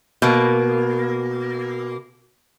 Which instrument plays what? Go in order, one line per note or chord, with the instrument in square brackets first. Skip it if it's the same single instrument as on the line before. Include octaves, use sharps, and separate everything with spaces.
[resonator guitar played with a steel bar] B2 A#3